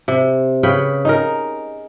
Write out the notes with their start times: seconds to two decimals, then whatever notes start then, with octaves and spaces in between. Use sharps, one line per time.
0.08 C3
0.63 C#3 B4 G5
1.05 D#4 G#4 A#4